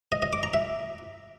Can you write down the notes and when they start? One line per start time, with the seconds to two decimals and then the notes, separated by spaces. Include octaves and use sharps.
0.12 D#5
0.22 D#5
0.33 D6
0.43 A#5
0.54 E5